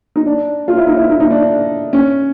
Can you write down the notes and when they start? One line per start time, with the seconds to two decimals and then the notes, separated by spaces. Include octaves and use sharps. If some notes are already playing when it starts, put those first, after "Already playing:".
0.16 D#4
0.26 D4
0.68 F4
0.77 E4
0.87 D#4
0.96 E4
1.10 D#4
1.20 D#4
1.31 D4
1.93 C#4